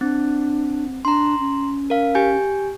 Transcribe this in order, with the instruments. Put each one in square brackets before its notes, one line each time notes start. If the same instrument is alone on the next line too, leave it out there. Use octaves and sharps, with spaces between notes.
[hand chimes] C4 [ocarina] D4
[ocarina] D4 [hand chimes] A#5 C6
[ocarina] C#4
[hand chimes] A#4 F5
G4 G#5 G6